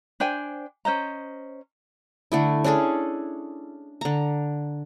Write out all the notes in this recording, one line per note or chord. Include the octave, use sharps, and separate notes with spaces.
D4 C5 G5 G#5
C#4 C5 D#5 A#5
D3 A3 E4
C#4 D4 G#4 A4
D3 A#5